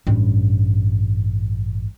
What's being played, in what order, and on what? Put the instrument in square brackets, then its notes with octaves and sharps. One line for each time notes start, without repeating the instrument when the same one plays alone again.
[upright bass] A1 G2